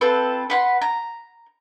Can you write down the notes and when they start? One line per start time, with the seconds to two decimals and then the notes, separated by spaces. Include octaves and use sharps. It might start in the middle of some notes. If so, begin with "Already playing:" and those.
0.01 C4 F4 A4 B4
0.50 B4 F#5 C6
0.82 A#5